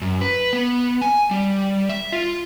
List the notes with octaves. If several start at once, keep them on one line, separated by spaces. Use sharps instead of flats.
F#2
B4
B3
G#5
G3
E5
F4